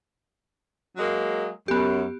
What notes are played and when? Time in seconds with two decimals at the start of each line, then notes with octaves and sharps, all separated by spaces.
0.97 F#3 G#3 A#3
1.68 F#2 B3 G4